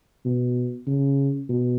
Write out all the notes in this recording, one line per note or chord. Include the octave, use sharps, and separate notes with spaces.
B2
C#3
B2